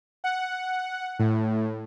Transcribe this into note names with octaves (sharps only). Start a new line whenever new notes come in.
F#5
A2